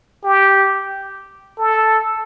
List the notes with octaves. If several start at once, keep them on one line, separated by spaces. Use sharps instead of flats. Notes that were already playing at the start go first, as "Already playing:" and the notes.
G4
A4